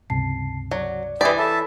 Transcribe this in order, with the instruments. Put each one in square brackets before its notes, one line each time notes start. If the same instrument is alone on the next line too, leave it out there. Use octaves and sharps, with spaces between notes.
[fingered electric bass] C#2 G2 C3 [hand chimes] A5 C7
[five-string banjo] F#3 [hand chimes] D5
[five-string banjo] E3 D5 [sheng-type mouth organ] E4 G4 G#4 [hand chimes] B5 B6
[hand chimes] A4 C#5 B5 [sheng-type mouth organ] E5 A5